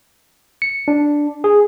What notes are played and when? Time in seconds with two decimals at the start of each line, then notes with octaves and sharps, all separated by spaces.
0.62 C#7
0.88 D4
1.44 G#4